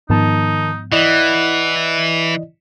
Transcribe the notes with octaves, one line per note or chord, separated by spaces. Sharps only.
G#2 D#3 F3 B3 D#4 A5
E3 E4 D5 D#5 F#5